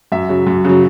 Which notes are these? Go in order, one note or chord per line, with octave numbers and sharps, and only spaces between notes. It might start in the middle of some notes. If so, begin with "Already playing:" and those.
F#2 E5
C#3 F#3
F#2
C#3 F#3